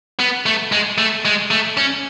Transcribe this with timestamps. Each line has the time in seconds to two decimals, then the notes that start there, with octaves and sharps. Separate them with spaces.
0.20 B3
0.46 A3
0.72 G#3
0.98 A3
1.25 G#3
1.51 A3
1.77 C#4